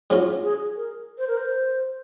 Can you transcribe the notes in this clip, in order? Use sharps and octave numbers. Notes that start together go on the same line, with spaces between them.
G#2 F#3 C#4 F4
G#4
A#4
C5
A#4
C5